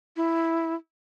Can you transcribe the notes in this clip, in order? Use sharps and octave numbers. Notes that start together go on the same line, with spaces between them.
E4